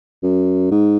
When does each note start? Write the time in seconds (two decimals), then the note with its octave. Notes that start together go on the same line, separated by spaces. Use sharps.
0.23 F#2
0.71 G#2